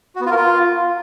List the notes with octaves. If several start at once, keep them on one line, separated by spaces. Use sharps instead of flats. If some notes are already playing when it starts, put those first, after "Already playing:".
F#4
B3
F4
A#4
F4